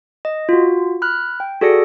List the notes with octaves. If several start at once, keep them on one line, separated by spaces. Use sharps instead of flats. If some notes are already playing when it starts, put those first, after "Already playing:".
D#5
F4 F#4
B5 F6 F#6
G5
F#4 G#4 A4 D5 A#6 C#7